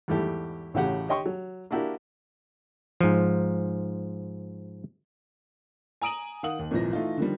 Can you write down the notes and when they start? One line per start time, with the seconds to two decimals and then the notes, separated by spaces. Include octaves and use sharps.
0.08 E2 G#2 G3 A3 E4 G4
0.74 A1 A2 C#3 F#4 G4 F#5
1.08 G4 C#5 D#5 G5 C6 C#6
1.26 F#3
1.71 A#3 D4 E4 F#4 G4 A#4
3.01 G#2 F3
6.02 G#5 A#5 D#6 D7 D#7 F#7
6.43 D#3 F5 F#5 D#6 F#7
6.59 D#2
6.71 G#1 A#2 E3 F3 A#6
6.93 E3 A3 D#4 F4
7.18 D3 D#3 F3 G3